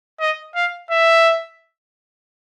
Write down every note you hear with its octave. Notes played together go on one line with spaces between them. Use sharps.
D#5
F5
E5